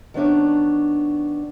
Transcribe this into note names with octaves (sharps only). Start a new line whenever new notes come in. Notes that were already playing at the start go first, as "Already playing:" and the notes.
D#3 B3 C#4 D4 D5